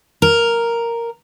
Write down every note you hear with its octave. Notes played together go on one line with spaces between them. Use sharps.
A#4